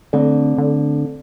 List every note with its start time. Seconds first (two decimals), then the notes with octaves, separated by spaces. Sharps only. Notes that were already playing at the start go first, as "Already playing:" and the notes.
0.13 D3 A3 C4 A4 D5
0.58 D3